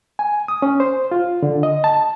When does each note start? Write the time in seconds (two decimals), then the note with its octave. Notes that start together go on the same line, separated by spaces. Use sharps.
0.19 G#5
0.48 D#6
0.62 C#4
0.80 C5
1.12 F4
1.43 D3
1.63 D#5
1.84 A5